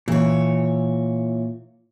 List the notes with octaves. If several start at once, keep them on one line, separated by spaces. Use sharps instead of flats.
A#2 E3 C#5